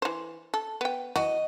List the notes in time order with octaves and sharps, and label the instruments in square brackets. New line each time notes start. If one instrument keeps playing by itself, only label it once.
[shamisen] E3 C5
A4
B3 G5
[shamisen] E3 F#4 [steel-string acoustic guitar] D#5